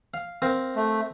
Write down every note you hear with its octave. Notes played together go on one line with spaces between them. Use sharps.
F5
C4 A#4 F5
A3